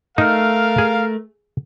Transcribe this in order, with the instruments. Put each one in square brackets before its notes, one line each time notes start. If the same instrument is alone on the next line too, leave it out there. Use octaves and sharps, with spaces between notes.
[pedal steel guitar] A3 [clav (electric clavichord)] D#4 [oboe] A#4 [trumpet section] F5
[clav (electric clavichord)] G#4